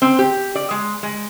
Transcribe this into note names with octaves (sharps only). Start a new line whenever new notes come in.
C4
G4
D5
G#3
G#3